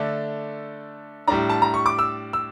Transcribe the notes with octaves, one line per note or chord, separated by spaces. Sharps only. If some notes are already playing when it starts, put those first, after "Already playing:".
Already playing: D3 A3 D4
A2 G3 D4 A#5
A5
A#5
C#6
D6
E6
E6